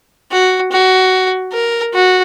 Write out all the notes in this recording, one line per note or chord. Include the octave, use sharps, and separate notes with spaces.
F#4
F#4
A#4
F#4